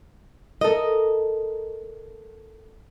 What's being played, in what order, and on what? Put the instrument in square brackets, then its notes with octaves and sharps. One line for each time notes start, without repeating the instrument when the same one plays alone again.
[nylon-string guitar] A4 A#4 D#5